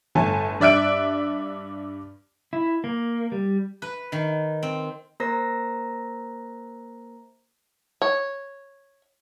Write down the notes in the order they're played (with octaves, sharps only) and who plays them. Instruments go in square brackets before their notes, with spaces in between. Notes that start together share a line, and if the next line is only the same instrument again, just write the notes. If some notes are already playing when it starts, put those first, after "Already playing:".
[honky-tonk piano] G1 A2 A3 G#5 A5
G2 D5 E5 F#6 D7
[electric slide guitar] E4
A#3
G3
[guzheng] B4
D#3
C4
[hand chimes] A#3 A#4 C5 A#5 A#6
[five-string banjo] C#5